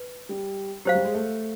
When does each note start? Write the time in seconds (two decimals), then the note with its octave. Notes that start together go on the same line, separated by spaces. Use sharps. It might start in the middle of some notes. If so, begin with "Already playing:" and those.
Already playing: B4
0.29 G3
0.85 F#3 G4 C5 F5
0.95 G3
1.05 G#3
1.14 A3